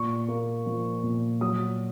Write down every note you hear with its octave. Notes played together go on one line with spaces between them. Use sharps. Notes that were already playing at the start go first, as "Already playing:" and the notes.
Already playing: A#2 C#6
A#3
F3
A#2
F#3 D#6